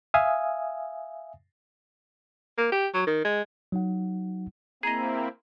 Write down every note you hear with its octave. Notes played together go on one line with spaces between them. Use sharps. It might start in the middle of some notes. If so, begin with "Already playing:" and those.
E5 F5 G#5 D#6
A#3
G4
F#3
D#3
G#3
F#3 D#4 F#5
A#3 C4 E4 G#4 D#5 A#5